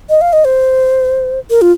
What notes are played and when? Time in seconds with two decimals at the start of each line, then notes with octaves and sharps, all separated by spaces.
0.10 D#5
0.21 F5
0.33 D#5
0.45 C5
1.50 A#4
1.62 F4